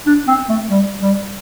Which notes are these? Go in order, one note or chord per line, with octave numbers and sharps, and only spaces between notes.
D4
C4
A3
G3
G3